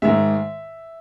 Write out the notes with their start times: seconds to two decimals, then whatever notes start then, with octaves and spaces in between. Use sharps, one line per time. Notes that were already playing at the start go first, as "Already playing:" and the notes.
0.02 G#2 D#3 G#3 E5